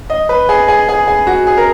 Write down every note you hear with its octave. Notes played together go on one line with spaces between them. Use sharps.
D#5
B4
G#4
G#4
G#4
G#4
F#4
G#4
A#4